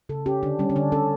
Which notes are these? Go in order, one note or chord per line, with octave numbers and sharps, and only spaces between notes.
C#3 A4
C#4 G4
D3 D4
G3 C#4
C#4
D3 D4
C#4 A4